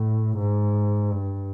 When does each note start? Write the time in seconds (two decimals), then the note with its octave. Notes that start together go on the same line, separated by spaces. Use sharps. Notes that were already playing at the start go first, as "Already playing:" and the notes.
Already playing: A2
0.38 G#2
1.11 G2